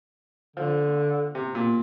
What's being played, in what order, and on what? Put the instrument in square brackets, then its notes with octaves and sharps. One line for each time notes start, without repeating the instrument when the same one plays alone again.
[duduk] D3 [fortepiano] F3
[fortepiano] C3
A#2